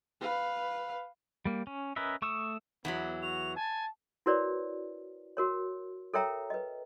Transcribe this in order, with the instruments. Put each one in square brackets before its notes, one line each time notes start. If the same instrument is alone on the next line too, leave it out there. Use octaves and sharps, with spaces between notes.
[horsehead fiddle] B4 F5
[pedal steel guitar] G3 A#3
C#4
C#4 A#4 B4 D#5 E5
A3 C#6 D#6 E6
[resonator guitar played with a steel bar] E2 E3 F#3 [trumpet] B3
[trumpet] F#4 [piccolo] F7
[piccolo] G#5 [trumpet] A5
[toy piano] E4 F#4 A#4 B4 C#5 D5
F#4 A#4 C#5
A4 A#4 C#5 E5 G5 A#5
B4 D#5